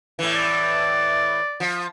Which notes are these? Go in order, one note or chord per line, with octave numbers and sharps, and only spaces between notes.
A2 E3
D5
F3